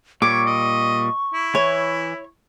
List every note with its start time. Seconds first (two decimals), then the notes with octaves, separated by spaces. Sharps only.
0.22 A#2 G3 C#5 C#6 D6
0.46 D#5
1.34 E4
1.55 E3 C#5